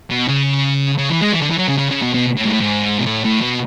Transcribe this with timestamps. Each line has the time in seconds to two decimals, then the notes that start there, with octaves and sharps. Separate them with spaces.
0.11 B2
0.28 C#3
0.98 C#3
1.09 E3
1.21 G#3
1.32 E3
1.42 D3
1.50 E3
1.58 F#3
1.68 C#3
1.79 C#3
1.91 C#3
2.02 B2
2.14 B2
2.37 A2
2.45 G#2
2.48 A2
2.60 G#2
2.98 B2
3.07 A2
3.25 A2
3.42 B2